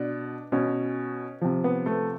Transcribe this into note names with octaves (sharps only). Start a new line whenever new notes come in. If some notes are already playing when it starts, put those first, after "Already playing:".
Already playing: B2 D4
B2 C#4
C3 F3
B3
A3